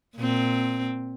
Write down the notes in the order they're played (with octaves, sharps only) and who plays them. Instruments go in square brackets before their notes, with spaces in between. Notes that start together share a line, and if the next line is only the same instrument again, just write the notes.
[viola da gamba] A#2 C4